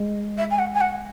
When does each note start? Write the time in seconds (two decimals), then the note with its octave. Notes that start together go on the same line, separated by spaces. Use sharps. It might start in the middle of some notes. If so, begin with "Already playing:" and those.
Already playing: G#3
0.37 E5
0.50 G#5
0.58 F#5
0.74 G#5
0.80 F#5